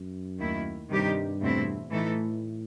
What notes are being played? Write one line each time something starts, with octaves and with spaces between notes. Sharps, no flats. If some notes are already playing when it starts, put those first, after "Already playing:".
Already playing: F#2
D#2 D#3 A3 E4
G2 C3 D#3 G3 D#4 G4
E2 B2 A3 C4 E4
A2 E3 A3 D#4 A4